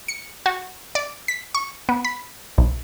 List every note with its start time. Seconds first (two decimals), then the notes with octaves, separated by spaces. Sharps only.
0.08 C#7
0.46 F#4
0.95 D5
1.28 B6
1.55 C#6
1.89 B3
2.05 B5
2.58 B1